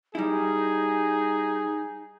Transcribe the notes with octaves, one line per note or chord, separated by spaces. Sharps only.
G3 D#4 E4 G#4